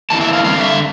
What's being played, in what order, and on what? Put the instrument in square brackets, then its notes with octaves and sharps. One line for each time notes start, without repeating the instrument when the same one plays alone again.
[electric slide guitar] F2 E3 A#3 A5
E5
F5
F2 D3 G3 F5
E5